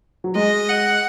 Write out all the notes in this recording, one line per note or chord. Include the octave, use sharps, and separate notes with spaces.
F#3
G#3 D#5
F#5